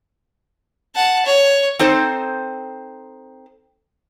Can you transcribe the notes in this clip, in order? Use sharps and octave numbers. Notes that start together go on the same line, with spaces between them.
F#5 A5
C#5
C4 D#4 A4 C5